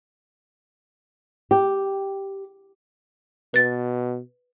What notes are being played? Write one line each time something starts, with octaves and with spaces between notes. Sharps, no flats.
G4
B2 B4 A6